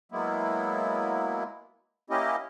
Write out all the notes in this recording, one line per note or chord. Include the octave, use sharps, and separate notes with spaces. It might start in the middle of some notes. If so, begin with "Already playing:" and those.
F#3 G#3 A#3 B3 E4
A#3 C#4 E4 G4 D#5